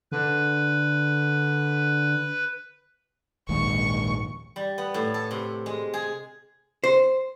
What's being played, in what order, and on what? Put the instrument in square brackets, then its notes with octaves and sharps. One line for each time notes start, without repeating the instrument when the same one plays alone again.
[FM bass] D3 [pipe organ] B4
[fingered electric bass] A#1 D#2 G#2 [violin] C#6
[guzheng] G3
B3
A2
A4
C3
G#3
G#4
[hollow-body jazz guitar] C5